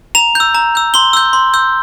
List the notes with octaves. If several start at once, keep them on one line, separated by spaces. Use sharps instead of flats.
A#5 F7
E6 G6
A#5
E6 G6
C6 G7
E6 G6
C6
E6 G6